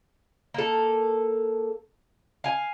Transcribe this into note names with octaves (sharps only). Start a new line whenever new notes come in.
A#3 A4
F5 G#5